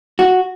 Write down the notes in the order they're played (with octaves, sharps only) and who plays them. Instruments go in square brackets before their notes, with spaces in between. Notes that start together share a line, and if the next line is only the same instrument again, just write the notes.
[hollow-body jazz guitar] F#4